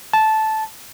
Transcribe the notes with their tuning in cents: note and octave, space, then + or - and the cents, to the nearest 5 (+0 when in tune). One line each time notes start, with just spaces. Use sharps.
A5 -10